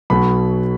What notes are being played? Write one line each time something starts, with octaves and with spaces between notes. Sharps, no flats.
B1 B2 F#3 B5